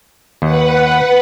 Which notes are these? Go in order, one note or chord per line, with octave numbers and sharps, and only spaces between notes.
D#2 B4 F#5